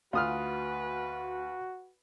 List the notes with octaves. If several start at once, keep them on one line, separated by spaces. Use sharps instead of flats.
D2 F4 F#4 B4 D#6 F6